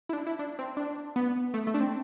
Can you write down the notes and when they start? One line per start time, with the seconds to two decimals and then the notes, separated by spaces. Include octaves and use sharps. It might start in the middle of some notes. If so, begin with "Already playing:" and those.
0.09 E4
0.13 D4
0.27 E4
0.39 D4
0.59 C4
0.77 D4
1.16 B3
1.54 A3
1.67 A3
1.74 D4
1.80 C4